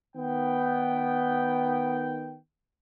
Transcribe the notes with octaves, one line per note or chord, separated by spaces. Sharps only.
D#3 B3 G5